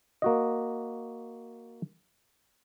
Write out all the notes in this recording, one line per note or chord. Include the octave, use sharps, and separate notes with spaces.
A#3 F#4 D#5